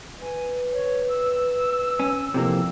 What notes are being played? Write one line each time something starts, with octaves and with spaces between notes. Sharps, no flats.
B4 G#5
C#5
E6
C#4
F2 C3 E3 A#3